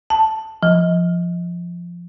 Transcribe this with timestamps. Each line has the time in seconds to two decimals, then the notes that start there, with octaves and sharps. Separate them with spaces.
0.10 A5
0.63 F3